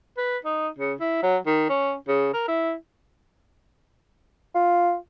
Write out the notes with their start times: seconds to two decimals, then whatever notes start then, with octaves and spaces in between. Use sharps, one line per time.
0.18 B4
0.45 D#4
0.79 C#3
1.00 E4
1.23 F#3
1.46 D#3
1.70 C#4
2.08 C#3
2.34 A#4
2.48 E4
4.55 F4